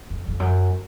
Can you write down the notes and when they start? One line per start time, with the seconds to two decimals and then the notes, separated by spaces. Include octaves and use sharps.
0.10 F2
0.28 F2
0.40 F#2